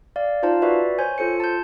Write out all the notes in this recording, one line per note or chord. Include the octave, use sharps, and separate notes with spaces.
D5 F5
D#4 F4 C5 F5 A5
F#4 B4 D5 E5
C5 C#5 G#5 G6
F4 A4 C5 C#7
A5 G6